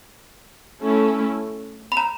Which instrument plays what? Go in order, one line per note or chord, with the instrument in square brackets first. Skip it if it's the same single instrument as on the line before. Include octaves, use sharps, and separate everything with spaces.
[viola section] A3 C#4 E4 A4
[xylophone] B5
A#5